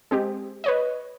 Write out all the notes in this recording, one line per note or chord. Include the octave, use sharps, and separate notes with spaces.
G#3 C4 G4
B4 C#5 D#5